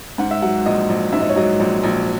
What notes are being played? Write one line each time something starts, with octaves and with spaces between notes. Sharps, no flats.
G#2 F#5
E5
F#3 F#5
A#1 D#5
A#1
G#2 E5
D#5
C#5
F#3 D#5
A#1
A#1